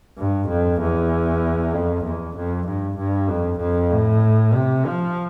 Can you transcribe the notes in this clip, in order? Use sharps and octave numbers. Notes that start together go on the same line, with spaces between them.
G2
F2
E2
F2
E2
F2
G2
G2
F2
F2
A2
C3
F3